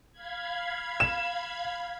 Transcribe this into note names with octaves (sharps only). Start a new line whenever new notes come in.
F5 B5 G#6
E7